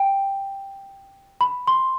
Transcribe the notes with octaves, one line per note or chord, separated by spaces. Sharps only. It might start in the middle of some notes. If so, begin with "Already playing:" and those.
Already playing: G5
B5
C6